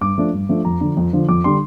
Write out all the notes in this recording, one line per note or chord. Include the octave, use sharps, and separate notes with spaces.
G2 D6
F3 A3 D4
G2
F3 A3 D4
F2 A#5
D3 F3
F2
D3 F3
F2 D6
D3 G3 C6